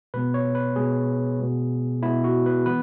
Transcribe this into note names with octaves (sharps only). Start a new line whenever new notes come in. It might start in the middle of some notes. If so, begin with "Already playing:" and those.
B2 G#3 B3 B4
C#5
B4
B2 G#3 B3 G#4
B2 G#3 B3
B2 G#3 B3 E4
F#4
B4
E3 B3 B4